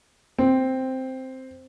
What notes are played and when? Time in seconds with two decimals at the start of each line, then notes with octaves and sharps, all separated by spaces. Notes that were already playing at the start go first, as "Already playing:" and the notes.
0.38 C4